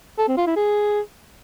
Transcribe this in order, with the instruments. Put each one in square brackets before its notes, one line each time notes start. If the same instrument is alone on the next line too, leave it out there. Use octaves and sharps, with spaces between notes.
[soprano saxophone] A4
C4
F4
E4
G#4